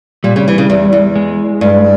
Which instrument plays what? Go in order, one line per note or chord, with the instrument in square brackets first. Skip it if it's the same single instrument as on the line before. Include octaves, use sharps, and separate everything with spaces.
[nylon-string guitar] A#2 [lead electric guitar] G3
[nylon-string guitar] C#3
E3
C#3
E2
E2
[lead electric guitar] G#3
[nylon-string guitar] G2